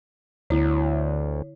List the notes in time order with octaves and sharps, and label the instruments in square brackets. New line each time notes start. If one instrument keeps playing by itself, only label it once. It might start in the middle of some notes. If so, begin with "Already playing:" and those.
[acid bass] D2 [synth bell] D3 E4 C#5